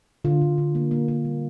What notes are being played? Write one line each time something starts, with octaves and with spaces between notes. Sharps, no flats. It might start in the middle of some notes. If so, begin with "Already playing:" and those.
D3 F4
D3
D3
A#3
A#3
A#3
G3